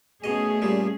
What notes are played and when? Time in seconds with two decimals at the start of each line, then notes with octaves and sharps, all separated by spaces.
0.24 B2 A3 C#4 G#4 D#5
0.62 A#2 G3